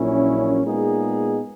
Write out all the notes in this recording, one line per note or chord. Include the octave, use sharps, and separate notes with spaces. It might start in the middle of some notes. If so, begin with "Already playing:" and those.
Already playing: A#1 A#2 F#3 C#4 E4
A#2 G#3 B3 D#4 G#4